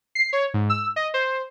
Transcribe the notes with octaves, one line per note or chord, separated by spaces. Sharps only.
C7
C#5
G#2
E6
D#5
C5